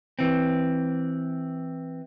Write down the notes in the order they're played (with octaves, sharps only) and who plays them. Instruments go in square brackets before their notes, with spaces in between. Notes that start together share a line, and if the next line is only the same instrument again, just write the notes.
[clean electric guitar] E3 C4